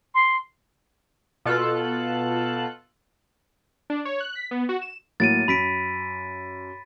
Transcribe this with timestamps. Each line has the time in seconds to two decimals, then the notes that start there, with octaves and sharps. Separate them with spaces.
0.15 C6
1.46 B2 F4 A4 F#6
3.90 D4
4.05 C#5
4.20 F#6
4.35 B6
4.51 B3
4.69 F#4
4.81 E7
5.20 A2 F#3 A#3 A6 D7 D#7
5.48 F#2 B5 B6 D7